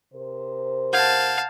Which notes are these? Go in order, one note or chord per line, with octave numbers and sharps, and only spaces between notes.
C3 A#4 C5
F5 F#5 A5 G6 G#6